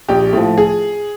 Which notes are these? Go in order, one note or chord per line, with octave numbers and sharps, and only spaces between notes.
A#1 G4
A2 F3
G#4